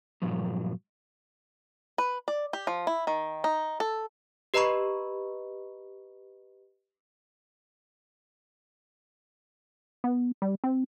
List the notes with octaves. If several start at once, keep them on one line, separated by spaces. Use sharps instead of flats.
G2 A#2 F3 F#3
B4
D5
G4
F3
E4
D#3
D#4
A4
G4 B4 D#5 A#5 B5 C#6
B3
G3
C4